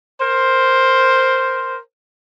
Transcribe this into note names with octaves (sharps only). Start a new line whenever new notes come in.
A#4 C5